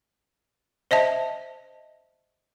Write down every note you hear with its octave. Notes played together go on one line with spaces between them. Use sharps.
C5 D#5 E5 A5